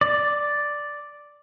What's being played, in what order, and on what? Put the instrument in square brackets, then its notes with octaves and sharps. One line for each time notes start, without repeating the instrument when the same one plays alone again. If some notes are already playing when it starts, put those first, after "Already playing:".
[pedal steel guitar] D5